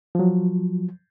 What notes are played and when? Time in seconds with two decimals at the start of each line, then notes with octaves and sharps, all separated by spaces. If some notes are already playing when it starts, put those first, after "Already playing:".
0.15 F3 F#3